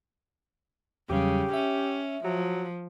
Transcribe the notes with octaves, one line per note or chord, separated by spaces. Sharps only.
E2 C#3 F#3 G3 G4
C#4 E5
F3 F#3